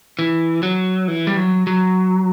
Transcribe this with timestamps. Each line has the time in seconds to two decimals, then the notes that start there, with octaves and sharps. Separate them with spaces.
0.19 E3
0.63 F#3
1.08 E3
1.27 G3
1.37 F#3
1.67 F#3